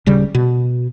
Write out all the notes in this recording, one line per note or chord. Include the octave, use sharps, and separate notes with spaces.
D#1 C#3 G3
B2